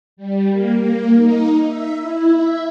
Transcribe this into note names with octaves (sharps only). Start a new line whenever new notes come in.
G3
A#3
A#3
D#4
E5
E4
E5